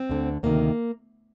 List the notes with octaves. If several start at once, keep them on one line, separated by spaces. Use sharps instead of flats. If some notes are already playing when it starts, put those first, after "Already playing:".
Already playing: C4
D2 D3
D2 C3 D#3 A#3